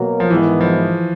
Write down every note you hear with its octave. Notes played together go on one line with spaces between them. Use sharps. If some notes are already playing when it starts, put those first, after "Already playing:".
Already playing: B2 F#3 A#3
F3
G#2 D#3 E3 G#3 B3 E4
F3